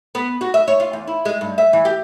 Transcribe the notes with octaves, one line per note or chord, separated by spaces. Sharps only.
B3
F#4
E5
C#5
F4
E2
E4
G#3
G2
E5
E3
G4